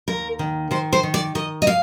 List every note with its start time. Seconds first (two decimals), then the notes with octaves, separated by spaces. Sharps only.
0.08 D#2 A#4
0.39 D#3
0.71 D#3 C5
0.93 C5
1.03 D#3
1.14 D5
1.35 D#3 D#5
1.62 D#5
1.67 F5